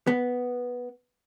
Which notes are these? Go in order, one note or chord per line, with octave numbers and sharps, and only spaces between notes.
B3